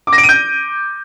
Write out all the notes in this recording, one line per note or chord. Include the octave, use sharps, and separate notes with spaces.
D6
A#6
D7
D#7
G6